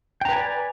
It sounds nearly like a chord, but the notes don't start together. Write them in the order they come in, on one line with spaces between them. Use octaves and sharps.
G5 A#5 B4 G#5 D5